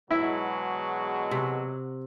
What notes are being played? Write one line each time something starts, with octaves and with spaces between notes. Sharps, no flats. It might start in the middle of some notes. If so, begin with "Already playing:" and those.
E2 B2 F#3 G#3 E4
C3